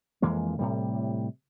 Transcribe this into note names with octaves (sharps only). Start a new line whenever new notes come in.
F2 E3 G#3 A#3
A2 C3 G3